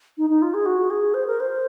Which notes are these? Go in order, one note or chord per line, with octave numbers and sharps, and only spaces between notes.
D#4
D#4
F4
G#4
F#4
G#4
C5
A#4
C5